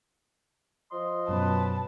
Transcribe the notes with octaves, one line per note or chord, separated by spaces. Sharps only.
F3 D#5 C6
F#2 B2 F#3 B4 A5